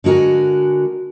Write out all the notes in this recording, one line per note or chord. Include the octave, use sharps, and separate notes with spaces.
D3 G#3 F#4 A#4 G#5